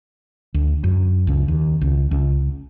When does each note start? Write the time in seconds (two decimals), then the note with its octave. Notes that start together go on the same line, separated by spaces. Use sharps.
0.54 D2
0.84 F#2
1.27 C#2
1.48 D#2
1.81 C#2
2.11 C#2